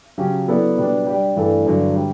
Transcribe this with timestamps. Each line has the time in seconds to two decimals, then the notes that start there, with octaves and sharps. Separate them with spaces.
0.18 C#3 F#3 C#4 G4
0.48 F#3 B3 E4 A4 D5
0.77 B2 G3 B3 D4
1.06 G3 D4 G4 D5
1.36 G2 E3 A3 D4 A4
1.66 G2 D3 F#3
1.95 D3 G3 D4